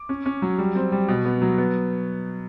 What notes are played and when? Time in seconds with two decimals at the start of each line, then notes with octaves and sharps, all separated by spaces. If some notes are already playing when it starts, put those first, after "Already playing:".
Already playing: D6
0.09 C#4
0.26 C#4
0.42 F#3
0.58 G3
0.75 C4
0.92 G3
1.08 B2
1.25 B3
1.42 F#3
1.58 B3